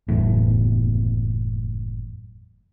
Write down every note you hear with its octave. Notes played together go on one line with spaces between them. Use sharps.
F#1 E2 A2